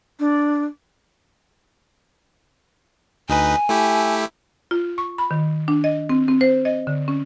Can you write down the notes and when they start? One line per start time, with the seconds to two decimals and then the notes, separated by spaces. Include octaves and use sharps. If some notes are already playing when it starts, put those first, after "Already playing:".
0.19 D4
3.29 D2 D#4 B4 G#5
3.69 A3 E4 G4
4.71 F4
4.98 C#6
5.18 B5
5.31 D#3
5.68 D4
5.84 D#5
6.09 C4
6.28 C4
6.41 C5
6.65 D#5
6.87 D3
7.08 C#4